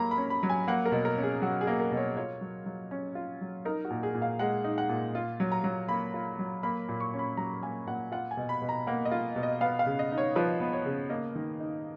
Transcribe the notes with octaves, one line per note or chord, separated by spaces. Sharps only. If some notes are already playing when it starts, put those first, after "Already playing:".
Already playing: F#3 A#3 A#5 B5
B5
C#4
B5
F#3
G#5
A#3 F#5
A#4
B2
A#4
C#4
G#4
F#3 F#4
G#4
A#3
A#4
B2
C#5
F4 C#5
F#3
F#3
C#4
F4
F#3
D#4 A#4
F#4
A#2
G#4
A#2
F5
G#3 F#5
D#4
F#5
A#2
F4
F#3
A#5
F#3
A#3 B5
F4
F#3
A#3 B5
A#2
C#6
C#4
B5
F#3 A#5
A#3 G#5
A#2 F#5
F4 F#5
G#5
B2
B5
B2
A#5
A#3 F#5
D#5
F4
B2
D#5
B3 F5
F5
C#3
D#5
D#4
C#5
F3 B4
B3
C#5
C#3
A#3 D#5
D#3
D#4